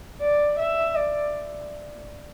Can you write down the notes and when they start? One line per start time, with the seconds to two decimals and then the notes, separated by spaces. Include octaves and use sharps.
0.21 D5
0.59 E5
0.96 D5